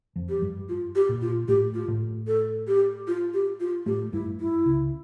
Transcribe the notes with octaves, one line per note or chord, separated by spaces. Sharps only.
F2 F3
G4
G2 G3
F4
G4
A#2 A#3
F4
A2 A3 G4
F4
A2 A3
A4
G4
F4
G4
F4
A2 A3 G4
G2 G3 E4
E4
C#2 C#3